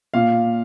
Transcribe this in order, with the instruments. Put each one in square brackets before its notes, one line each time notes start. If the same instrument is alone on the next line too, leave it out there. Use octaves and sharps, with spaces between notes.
[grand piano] A#2 F5